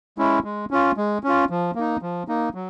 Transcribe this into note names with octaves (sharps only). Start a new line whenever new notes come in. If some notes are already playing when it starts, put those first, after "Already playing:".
G#3 C#4 E4
G#3
C#4 F4
G#3
C#4 F4
F3
A#3 D#4
F3
A#3 D#4
F#3